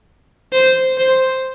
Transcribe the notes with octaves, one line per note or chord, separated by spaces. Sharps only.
C5
C5